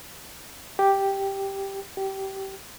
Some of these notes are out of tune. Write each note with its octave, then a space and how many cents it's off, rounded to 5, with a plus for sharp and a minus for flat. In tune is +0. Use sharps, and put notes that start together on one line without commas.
G4 +0
G4 -20